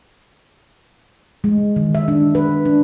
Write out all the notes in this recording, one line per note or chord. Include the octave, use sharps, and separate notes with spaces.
G#3
D#3
E5
D4
B4
D4